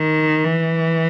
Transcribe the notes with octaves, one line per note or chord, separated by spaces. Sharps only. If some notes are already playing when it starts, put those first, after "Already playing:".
Already playing: D#3
E3